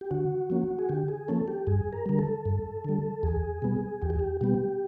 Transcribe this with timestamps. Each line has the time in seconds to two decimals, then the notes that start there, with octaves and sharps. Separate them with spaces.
0.01 G4
0.11 D3 F#4
0.50 F3 A#3 C#4
0.79 G#4
0.89 D3 G4
1.08 G#4
1.28 F3 A#3 C#4 A4
1.48 G4
1.67 G2 G#4
1.93 A#4
2.06 D3 G3 A#4
2.19 A4
2.46 G2
2.85 D3 G3
3.23 E2 G#4
3.62 B2 G3 B3
4.02 E2 G4
4.10 G#4
4.19 G4
4.41 B2 G3 B3 G4